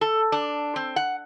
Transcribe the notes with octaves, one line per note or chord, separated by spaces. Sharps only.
A4
D4
C4
F#5